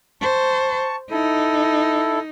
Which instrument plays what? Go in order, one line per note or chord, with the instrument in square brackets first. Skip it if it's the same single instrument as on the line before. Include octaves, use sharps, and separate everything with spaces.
[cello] C5 [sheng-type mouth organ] A5 C#6
[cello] D#4 [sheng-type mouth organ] E4 A4